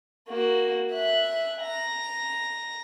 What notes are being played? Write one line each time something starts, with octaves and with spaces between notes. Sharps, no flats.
A#3 F#4
E5 F#6
A#5